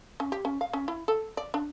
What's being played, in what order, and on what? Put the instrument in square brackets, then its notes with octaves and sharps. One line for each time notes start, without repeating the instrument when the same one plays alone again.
[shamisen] C#4
G4
C#4
F5
C#4
E4
A4
D5
D4